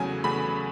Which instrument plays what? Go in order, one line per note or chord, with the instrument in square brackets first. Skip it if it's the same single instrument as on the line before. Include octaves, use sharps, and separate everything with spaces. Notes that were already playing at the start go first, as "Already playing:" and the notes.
Already playing: [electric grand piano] E2 C#3 F#3 A3 G#5
E2 C#3 F#3 A3 B5